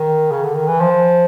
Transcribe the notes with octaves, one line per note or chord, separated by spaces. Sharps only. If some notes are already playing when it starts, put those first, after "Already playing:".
Already playing: D#3
C#3
D3
D#3
E3
F3